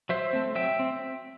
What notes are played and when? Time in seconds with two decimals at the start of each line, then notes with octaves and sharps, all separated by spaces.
0.09 F#3 C5 E5
0.33 A3 C4
0.55 F#3 E5 G5
0.79 C4